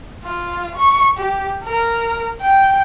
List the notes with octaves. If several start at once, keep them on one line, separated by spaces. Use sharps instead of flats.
F4
C#6
G4
A#4
G5